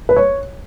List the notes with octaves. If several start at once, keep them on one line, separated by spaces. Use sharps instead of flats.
B4
C#5